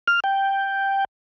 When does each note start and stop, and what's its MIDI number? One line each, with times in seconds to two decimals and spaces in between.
0.08 0.20 89
0.24 1.05 79